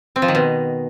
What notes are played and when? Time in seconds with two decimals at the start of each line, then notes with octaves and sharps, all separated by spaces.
0.16 C4
0.22 F3
0.28 D#3
0.35 B2